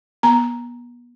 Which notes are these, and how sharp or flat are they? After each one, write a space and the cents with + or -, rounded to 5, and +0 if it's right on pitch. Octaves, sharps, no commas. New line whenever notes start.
B3 -35 A#5 +0